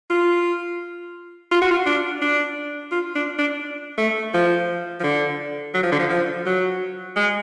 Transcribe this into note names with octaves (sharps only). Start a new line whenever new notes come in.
F4
F4
F#4
F4
D4
D4
F4
D4
D4
A3
F3
F3
D3
F#3
F3
D3
F3
F3
F#3
G#3